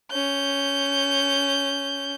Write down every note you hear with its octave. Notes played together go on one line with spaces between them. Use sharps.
C#4 G6